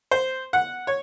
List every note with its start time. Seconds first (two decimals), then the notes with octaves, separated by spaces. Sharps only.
0.11 C5
0.53 F#5
0.87 C#5